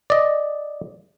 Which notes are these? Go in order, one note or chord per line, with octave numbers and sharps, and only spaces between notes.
D5 D#5